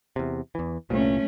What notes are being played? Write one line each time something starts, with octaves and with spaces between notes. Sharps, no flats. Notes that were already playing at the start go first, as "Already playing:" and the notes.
E2 C3
E2 E3
C2 G2 A#2 A3 C#4